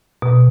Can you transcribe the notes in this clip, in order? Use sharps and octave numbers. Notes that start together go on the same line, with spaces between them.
B2